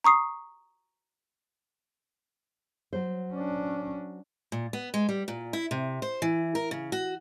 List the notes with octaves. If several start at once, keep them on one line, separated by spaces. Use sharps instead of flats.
A#5 C#6 D#6 C7
F#3 C5
C#4 D4
A#2
B3
G#3
G3
A#2
E4
C3
C5
E3
A#4
C#3
F#4